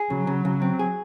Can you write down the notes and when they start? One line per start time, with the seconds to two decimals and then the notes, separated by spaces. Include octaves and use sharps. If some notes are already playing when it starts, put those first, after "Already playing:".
Already playing: G#4
0.10 C#3 F#3
0.27 C#3
0.45 C#3
0.62 C4
0.79 G#4